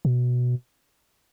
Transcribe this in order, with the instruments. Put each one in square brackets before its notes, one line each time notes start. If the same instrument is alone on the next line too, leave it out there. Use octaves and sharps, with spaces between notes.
[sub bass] B2